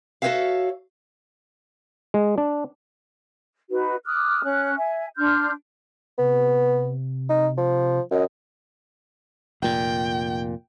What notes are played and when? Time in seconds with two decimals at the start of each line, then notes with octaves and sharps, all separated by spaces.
0.22 F#4 A4 C5 C#5 E5 F5
2.14 G#3
2.38 D4
3.70 D#4 F#4 B4
4.05 D6 D#6 F6 F#6
4.43 C#4 F#6
4.77 E5 G#5
5.17 D4 C6 F6 G6
6.18 C3 B3
7.29 D#4
7.58 F3
8.11 F#2 D#5
9.62 F1 A#2 G5